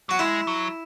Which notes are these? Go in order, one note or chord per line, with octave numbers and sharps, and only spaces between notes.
F#3 F#4
G#3 E4
F#3